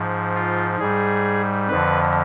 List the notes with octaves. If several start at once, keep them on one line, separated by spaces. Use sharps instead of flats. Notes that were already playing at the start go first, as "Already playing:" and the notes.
Already playing: G#2 F3
F4
G#2 G3 G#4
F2 D3 F3 B4